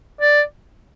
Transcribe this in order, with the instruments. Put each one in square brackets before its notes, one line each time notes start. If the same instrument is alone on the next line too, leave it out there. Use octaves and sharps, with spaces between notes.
[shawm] D5